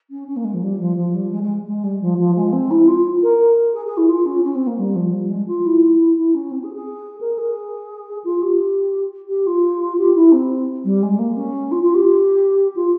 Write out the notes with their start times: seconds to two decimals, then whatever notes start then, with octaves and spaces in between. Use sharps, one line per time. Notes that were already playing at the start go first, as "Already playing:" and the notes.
0.10 C#4
0.27 C#4
0.36 A#3
0.44 G#3
0.53 F3
0.62 G3
0.79 F3
0.96 F3
1.14 G3
1.31 G#3
1.42 G#3
1.66 G#3
1.83 G3
2.01 F3
2.18 F3
2.35 G#3
2.52 C4
2.70 E4
2.87 F4
3.22 A#4
3.73 G#4
3.85 G#4
3.97 E4
4.09 F4
4.25 C#4
4.44 C#4
4.54 C4
4.66 A#3
4.77 G3
4.95 F3
5.13 G3
5.30 G#3
5.47 F4
5.65 E4
6.17 E4
6.34 C#4
6.51 C4
6.63 G#4
6.74 G#4
7.20 A#4
7.38 G#4
8.24 F4
8.42 G4
9.28 G4
9.46 F4
9.98 G4
10.15 E4
10.32 C4
10.84 G3
11.02 G#3
11.18 A#3
11.36 C#4
11.71 F4
11.82 F4
11.94 G4
12.75 F4